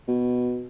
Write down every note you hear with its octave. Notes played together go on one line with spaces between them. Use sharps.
B2